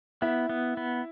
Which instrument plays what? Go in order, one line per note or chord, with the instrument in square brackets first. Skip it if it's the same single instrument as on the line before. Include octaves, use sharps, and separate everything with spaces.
[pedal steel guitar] B3 [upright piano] E4 E5
[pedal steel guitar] B3
B3